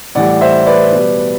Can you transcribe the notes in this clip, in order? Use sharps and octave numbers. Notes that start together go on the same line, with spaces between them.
A2 E3 G3 D5 F#5
C5 E5
B4 D5
B2 G3